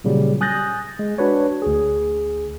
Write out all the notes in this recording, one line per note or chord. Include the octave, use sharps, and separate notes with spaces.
A#2 C#3 F#3 G3
G#5 D#6 F#6 G6 A6 A#6
G#3
D4 F#4 B4 C#5
D2 G#4